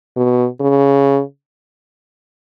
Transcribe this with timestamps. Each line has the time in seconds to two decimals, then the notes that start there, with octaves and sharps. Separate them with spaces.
0.17 B2
0.60 C#3